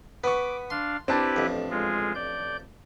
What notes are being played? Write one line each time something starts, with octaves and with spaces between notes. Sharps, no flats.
B3 B4 C#6 D6
D4 F5 C6
C4 D4 E4 G4 B4 A5
A1 F2
G#3 F4 G#4
D5 G6